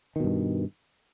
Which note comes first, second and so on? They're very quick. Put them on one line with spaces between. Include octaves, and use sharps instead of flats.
D#3 B2 G2